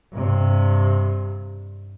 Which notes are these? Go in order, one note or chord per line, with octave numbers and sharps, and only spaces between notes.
G2 C3